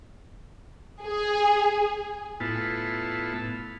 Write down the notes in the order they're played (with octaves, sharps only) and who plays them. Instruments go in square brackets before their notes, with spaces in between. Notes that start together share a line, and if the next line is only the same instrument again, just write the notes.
[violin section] G#4
[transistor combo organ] A2 B3 E4 F4 A5